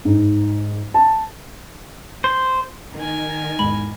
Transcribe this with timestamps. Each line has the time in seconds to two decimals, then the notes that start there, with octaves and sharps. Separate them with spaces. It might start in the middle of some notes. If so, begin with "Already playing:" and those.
0.05 G#2
0.94 A5
2.24 C5
2.95 D#3 A#4 G#5
3.59 E2 G#2 G#3 B5